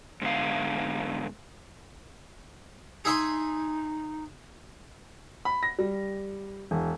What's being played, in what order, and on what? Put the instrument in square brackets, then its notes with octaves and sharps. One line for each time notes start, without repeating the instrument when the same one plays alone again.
[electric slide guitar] G#2 D3 B3 F5
[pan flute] D#4 [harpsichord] G#4 E5 C6
[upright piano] B5
A#6
G3
E1